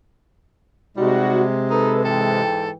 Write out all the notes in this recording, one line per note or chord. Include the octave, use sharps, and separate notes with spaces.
C3 G3 G#3 D#4 F#4
D#4 A4 B4
G#2 E3 A4 G5